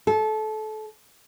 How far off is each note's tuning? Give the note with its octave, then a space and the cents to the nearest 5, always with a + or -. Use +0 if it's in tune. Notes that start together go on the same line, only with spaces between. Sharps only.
A4 -25